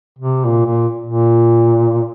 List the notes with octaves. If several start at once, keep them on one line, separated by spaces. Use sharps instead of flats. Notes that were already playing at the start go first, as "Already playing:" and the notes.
C3
A#2
A#2
A#2